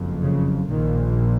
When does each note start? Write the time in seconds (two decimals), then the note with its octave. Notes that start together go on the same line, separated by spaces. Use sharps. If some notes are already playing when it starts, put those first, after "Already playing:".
Already playing: F#1 F2
0.23 C#3
0.69 A#1 A#2 D#3